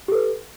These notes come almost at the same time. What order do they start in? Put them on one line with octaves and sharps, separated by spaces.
G4 A4 B4